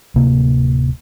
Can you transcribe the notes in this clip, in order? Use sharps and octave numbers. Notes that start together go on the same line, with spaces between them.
D1 C3 A#3